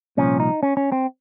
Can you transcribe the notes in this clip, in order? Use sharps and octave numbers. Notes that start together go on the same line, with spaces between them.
C2 A#2 F3 C#4
D#4
C#4
C#4
C4